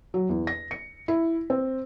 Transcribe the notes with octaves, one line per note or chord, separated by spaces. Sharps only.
F#3
E2
A#6
C#7
E4
C4